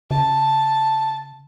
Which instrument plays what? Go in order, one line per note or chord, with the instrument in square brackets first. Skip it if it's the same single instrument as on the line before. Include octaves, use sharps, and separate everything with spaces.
[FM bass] C#3 [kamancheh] A5